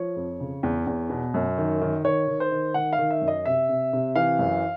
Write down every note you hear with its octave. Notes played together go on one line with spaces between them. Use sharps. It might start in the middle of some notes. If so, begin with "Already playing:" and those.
Already playing: F3 C#5
F2
C#3
E2
E2
B2
F#2
D#3
D#3
D#3 C#5
D#3
C5
D#3
D#3 F#5
F5
D#3
E5
F#2
D#5
C3 E5
C3
C3
E3 F5
F#2